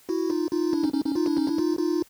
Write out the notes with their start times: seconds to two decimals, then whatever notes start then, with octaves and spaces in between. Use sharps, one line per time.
0.09 E4 F#4
0.30 D#4 F4
0.51 D#4 F4
0.73 D4 E4
0.83 C#4 D#4
0.94 C#4 D#4
1.05 C#4 D#4
1.15 D#4 F4
1.26 D4 E4
1.37 C#4 D#4
1.47 D4 E4
1.58 D#4 F4
1.79 D#4 F4